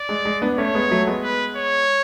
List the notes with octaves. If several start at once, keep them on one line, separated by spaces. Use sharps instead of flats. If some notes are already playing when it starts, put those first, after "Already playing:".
Already playing: D5
G#3
G#3
B3 D4
A3 C#4 C#5
G#3 B3
F#3 A3
G#3 B3
B4
C#5